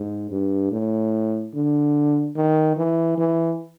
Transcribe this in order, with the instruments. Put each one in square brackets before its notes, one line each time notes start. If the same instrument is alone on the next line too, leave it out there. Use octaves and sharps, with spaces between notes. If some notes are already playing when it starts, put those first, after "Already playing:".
Already playing: [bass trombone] G#2
G2
A2
D3
D#3
E3
E3